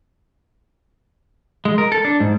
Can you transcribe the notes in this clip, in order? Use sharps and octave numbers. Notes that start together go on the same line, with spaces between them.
G#3
A#4
A4
D4
G#2